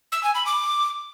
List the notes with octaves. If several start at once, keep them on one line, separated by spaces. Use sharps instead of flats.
E6
G#5
B5
D6